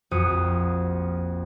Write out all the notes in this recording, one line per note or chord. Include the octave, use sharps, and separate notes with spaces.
A#1 F2 F#4 D#6 C#7